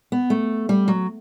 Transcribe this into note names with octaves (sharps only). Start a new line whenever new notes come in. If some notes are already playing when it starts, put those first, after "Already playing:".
B3
A3
G3
F#3